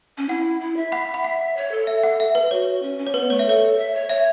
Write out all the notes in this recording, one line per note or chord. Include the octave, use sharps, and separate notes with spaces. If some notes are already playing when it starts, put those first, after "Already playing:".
C#4
E4 F#5
E4
E5
F#5 B5
F#5 B5
F#5
C#5
A4
E5
F#5
E5
B4
F#4 C#5
C#4
C#4
C#5
B3 B4
A3 C#5
E5
A4 C#5
E5
C#5
C#5 E5